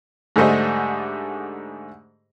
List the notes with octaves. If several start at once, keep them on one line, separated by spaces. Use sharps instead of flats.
G#2 D3 G3 A3 C5 D#5